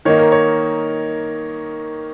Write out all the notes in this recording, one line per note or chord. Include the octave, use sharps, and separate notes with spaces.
D#3 A#3 D#4 C#5
A#4
C#5